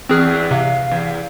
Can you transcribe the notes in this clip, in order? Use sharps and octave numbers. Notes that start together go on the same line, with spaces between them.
E2 C4 G#4 F6 F#6
C3 F5
E2